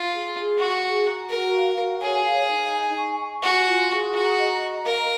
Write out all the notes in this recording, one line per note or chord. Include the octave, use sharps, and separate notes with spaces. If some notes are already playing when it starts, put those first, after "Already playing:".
Already playing: F4
G#4
G#4
F#4 C#6
G#4
A#5
F#4 A#4
F5
F#4
G#4 C#5
F5
D#4
G#5
C#6
G#5
F#4 G#5
F4
G#4
F#4 A#5
D#5
A#5
A#4 F5